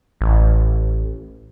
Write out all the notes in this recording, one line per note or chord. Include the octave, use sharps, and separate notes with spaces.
A1